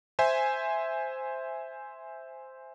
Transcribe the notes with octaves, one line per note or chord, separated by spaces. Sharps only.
C5 E5 G#5